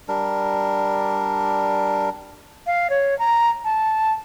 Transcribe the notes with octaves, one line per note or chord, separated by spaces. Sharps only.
G3 D4 A#4
F5
C#5
A#5
A5